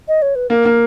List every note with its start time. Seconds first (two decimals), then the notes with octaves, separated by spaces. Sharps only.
0.08 D#5
0.22 C#5
0.35 B4
0.50 A#3 A#4
0.65 A#3